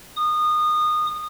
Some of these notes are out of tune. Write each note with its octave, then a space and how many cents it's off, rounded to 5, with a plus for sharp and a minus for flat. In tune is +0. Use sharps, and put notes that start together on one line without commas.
D#6 -25